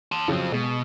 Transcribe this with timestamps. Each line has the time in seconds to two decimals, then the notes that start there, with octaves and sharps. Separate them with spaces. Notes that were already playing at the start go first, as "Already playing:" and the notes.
0.12 A5 C6
0.28 F2 C#3 F#3 C4
0.52 B2 G#3